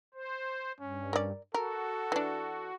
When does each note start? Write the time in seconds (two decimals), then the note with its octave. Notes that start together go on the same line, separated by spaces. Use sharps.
0.14 C5
0.81 G2 C#4
1.13 A#4 D5
1.54 F#4 A4 A#4
2.12 E3 D4